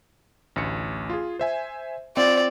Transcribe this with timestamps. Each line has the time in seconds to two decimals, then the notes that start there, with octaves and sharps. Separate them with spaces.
0.56 A1 D2 C#7
1.10 F4 G#4
1.39 C5 E5 G#5
2.17 C4 F4 D5